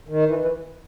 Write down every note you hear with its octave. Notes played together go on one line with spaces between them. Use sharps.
D#3
E3
E3